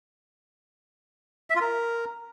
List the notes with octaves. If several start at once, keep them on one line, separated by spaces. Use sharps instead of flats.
E5
F4
A#4